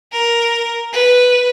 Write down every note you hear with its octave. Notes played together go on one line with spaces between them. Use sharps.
A#4
B4